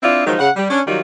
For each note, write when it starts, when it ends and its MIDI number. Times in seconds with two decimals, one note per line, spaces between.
0.03 0.25 60
0.03 0.25 62
0.03 0.25 64
0.03 0.25 65
0.26 0.35 51
0.26 0.35 53
0.26 0.35 54
0.26 0.35 56
0.26 0.35 63
0.39 0.51 49
0.39 0.51 78
0.56 0.67 55
0.70 0.81 61
0.70 0.81 62
0.87 1.00 51
0.87 1.00 54
0.87 1.00 55
0.87 1.00 63
0.87 1.00 65